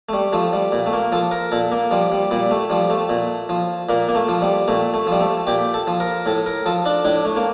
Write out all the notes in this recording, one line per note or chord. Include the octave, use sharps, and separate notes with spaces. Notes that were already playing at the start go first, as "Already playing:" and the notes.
A3
G3
F3 A3
G3
A#2
A3
A#3
F3 A4
A#4
A#2 A4
A#3
F3 G3
G3
A#2 G3
A3
F3 G3
A3
A#2
F3
A#2 A#3
A#3
A3
F3
G3
A#2 A3
A3
F3 G3
A3
A#2 G4
A4
F3
A#4
A2 A4
A#4
F3 A4
D4
A2 D4
A3
A#3